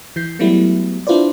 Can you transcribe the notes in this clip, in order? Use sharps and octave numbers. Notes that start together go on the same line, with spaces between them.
E3 G6 C7
F#3 G3 A3 B3 E4
D4 E4 F4 B4 C5 D5